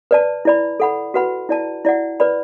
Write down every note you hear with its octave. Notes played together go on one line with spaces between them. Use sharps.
B4 D5 A5
E4 D5 B5
A4 F#5 B5
F#4 B4 F#5 B5
E4 D5 A5
E4 D5 F#5
B4 D5 B5